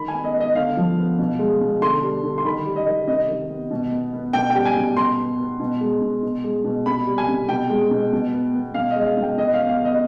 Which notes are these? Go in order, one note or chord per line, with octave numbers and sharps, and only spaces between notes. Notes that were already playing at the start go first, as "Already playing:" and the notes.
Already playing: D#3 B5
G#5
B3
D#5
B3
D#5
D3 F5
F3
B3
B2
G#3
B2
D3 C6
G3
D3
C6
D#3 B5
G3
D#5
D#3
C3 D#5
D#3
B3
B2
B3
B3
B2 G5
G3 G5
G#5
B2
B2 C6
B3
B3
B2
G#3
B2
B2
G#3
B2
C3 B5
G3
G#5
C3
B2 G5
G#3
B2
B2
B3
B3
B2 F5
D#5
G#3
F5
B2
G5
B2 D#5
F5
B3
F5
B3 D#5